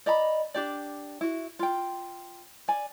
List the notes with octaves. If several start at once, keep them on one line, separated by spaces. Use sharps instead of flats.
D5 D#5 A#5 B5
D4 G4 D5
E4 F#4
F4 G5
D5 G#5